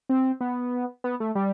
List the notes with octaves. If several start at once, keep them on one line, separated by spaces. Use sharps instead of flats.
C4
B3
B3
A3
G3